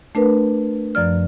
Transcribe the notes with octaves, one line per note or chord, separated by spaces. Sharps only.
A3 D4 A#4 B4
F#2 F3 D5 F6